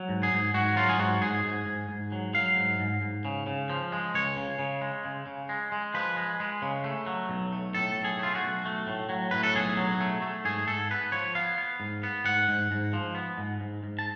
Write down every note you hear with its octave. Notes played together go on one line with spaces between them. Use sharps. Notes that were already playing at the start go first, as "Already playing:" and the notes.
Already playing: F#3
G#2
G#4
G#2
G#2 F#4
F#3 F4
G#4
G#2 F#4
G#2 G#4
G#2
G#2
G#2
F#3
F#3 F5
G#2
G#2
G#2
C#3
C#3
F3
G#3
C#2 C#5
C#3
C#3
G#3
C#3
C#3
G#3
G#3
F3 B4
G#3
G#3
C#3
A3
F#3
B1
A3
A2 A4
B1
G#4
A3 F4
F#4
B1
A3
A2
F#3
A2 B4
A4
B1 G#4
F#3
A3
A3
G#2 G#4
G#2 A4
B3 B4
F3 C#5
B3 F5
B3
G#2
B3
G#2 F#5
G#2
G#2
F3
B3
G#2
G#2
G#2
A5